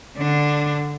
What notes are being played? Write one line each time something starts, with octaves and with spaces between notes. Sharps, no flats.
D3 D4